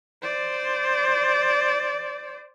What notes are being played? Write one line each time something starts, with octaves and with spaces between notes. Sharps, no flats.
C5 D5